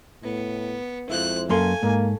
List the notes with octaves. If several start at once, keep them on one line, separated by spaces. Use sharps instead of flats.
A2 B3
F2 F3 G#3 E4 C5 F#6
F#2 A#3 C#4 A4 F5 G#5 C6
G#2 A#3